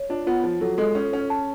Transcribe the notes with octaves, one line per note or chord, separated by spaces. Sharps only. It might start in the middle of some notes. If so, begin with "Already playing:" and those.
Already playing: C#5
D4 F4
B3 F4
F3 F4
F#3 A4
G#3 A4
C#4 C#5
C#4 C#5
A5